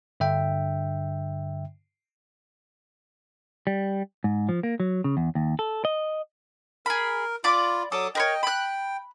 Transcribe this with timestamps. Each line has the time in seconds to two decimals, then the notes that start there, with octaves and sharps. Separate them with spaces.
0.20 G2 D3 E5 G5
3.67 G3
4.24 G#2
4.49 F3
4.63 A#3
4.80 F#3
5.04 C#3
5.17 E2
5.35 D#2
5.59 A4
5.85 D#5
6.86 G#4 A#4 B5
7.44 F4 D5 B5 D6
7.92 F#3 A4 D6 D#6
8.15 A#4 B4 C#5 D#5 G5
8.43 G5 B5 F#6